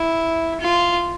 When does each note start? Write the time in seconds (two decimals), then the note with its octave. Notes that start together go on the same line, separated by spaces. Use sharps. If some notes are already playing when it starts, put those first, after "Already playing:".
Already playing: E4
0.60 F4